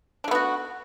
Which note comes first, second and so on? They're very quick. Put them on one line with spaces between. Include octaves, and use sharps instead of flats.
D4 A3 B3 F#4